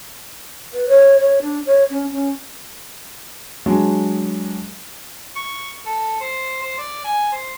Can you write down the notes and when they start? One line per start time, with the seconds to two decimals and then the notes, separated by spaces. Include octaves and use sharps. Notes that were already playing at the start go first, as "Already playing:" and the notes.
0.73 B4
0.88 C#5
1.20 C#5
1.41 D4
1.66 C#5
1.90 C#4
2.12 C#4
3.66 F#3 G#3 D4
5.36 C#6
5.86 A4
6.21 C5
6.63 C5
6.78 D5
7.05 G#5
7.32 C5